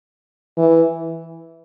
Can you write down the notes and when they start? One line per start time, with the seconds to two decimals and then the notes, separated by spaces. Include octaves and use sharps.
0.58 E3